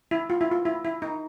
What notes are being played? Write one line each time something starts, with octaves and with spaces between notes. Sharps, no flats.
E4
F4
E4
F4
E4
E4
D#4